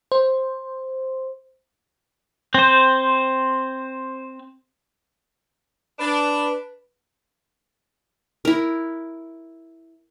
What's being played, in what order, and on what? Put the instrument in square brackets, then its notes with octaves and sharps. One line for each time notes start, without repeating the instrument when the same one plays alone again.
[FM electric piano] C5
[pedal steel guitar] C4 C5
[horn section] D4 [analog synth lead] B4
[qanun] E4 A#4